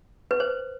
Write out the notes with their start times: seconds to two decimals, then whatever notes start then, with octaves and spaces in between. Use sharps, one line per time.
0.31 B4
0.40 C5